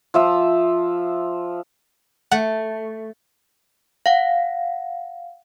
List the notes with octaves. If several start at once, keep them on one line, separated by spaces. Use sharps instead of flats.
F3 E5 E6
A3 F#5
F5 F#5